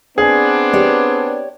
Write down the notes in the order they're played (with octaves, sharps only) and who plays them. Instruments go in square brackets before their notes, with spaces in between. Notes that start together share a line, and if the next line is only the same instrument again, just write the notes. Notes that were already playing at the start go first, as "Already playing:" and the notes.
[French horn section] B3 C4 D4 [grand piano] G#4
[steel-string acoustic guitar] G4 C#5 D5